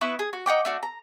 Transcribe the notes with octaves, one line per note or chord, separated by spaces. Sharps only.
B3 E4 B4 C#6
G#4
F#4
D#4 F#5 G5 D6
A3 D4 F#4
A#5